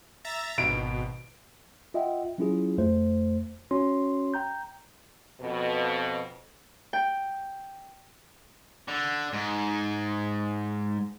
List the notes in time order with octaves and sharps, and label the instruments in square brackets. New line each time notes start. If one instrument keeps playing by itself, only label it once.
[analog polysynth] E5 A#5 A6
[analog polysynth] G#1 B2 [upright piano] D7
[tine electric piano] F4 D#5 E5 F#5 G5
F#3 C#4 E4 F4 G#4
F2 A3 C5
C#4 F#4 C#5 C6
G5 A#5 G6
[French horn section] F2 B2
[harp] G5
[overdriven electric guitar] D3
G#2